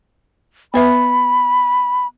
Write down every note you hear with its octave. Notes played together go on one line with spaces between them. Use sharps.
B3 B4 E5 B5